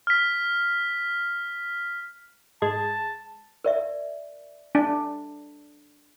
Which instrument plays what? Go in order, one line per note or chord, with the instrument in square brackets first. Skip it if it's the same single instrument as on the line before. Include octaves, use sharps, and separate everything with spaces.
[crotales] F6 B6
[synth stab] G#2 G#3 G#6 [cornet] A5
[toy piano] A#4 D5 E5
[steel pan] D4